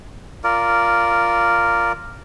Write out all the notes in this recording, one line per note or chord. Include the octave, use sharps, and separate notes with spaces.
F4 A#4 D5